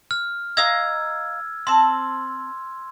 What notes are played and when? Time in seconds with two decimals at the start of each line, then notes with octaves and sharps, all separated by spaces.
0.11 F6
0.57 D#5 F5 A#5 E6 G#6
1.67 C4 A5 C6